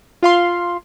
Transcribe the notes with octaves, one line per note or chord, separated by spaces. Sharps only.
F4 F5 C6